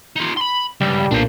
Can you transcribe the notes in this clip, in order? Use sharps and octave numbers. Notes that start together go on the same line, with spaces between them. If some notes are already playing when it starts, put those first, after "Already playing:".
D#4 F4
B5 C6
C#2 G2 G3
B1 A#2 D4 C5